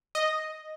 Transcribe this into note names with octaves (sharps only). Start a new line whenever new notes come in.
D#5